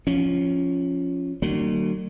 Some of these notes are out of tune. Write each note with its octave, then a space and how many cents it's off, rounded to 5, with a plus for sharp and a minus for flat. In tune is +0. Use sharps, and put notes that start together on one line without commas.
F3 +0 C#4 +0
D#3 -45 F#3 +35 A#3 -45